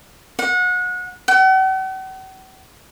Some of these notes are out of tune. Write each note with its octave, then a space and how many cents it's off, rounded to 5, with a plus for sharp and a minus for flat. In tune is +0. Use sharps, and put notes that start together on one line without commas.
F#5 -30
F#5 +45